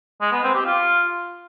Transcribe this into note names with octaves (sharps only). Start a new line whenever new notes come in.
G#3
B3
C4
G4
F4